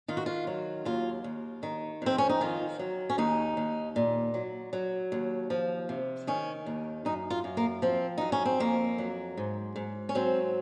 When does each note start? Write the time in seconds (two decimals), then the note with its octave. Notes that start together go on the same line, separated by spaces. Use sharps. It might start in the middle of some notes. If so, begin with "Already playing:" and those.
0.08 D#3 F4
0.17 F#4
0.26 F4
0.47 F#3
0.85 D#2 F4
1.24 D#2
1.63 D#3
2.02 F2 C4
2.18 C#4
2.29 D#4
2.41 D#3 F4
2.79 F#3
3.10 C#4
3.18 D#2 D#4
3.57 D#2
3.96 A#2
4.34 F#3
4.73 F#3
5.12 D#2
5.50 F3
5.89 C3
6.27 D#3 C#4
6.66 D#2
7.05 F#2 D#4
7.30 F4
7.44 F#2
7.57 A#3
7.82 F3 C4
8.18 F#2 D#4
8.32 C#4
8.45 C4
8.60 F2 A#3
8.98 F#3
9.37 G#2
9.76 G#2
10.09 C#4
10.15 F#3 C4